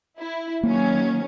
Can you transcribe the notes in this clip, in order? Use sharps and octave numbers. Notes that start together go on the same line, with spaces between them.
E4
D#3 F#3 A#3 C#4